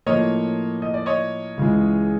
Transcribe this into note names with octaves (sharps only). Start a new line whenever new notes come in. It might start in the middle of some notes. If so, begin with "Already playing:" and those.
A2 F3 A#3 C#5 D#5
D#5
D5
C#5 D#5
C#2 C#3 E3 G#3